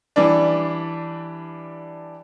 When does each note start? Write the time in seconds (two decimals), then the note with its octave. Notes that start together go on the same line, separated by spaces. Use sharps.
0.16 E3 G3 D4